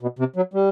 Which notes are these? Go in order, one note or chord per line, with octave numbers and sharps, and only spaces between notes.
B2
C3
F#3
G3